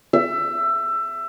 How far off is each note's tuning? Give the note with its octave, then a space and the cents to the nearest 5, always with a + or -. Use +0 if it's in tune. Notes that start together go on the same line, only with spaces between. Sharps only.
E5 +20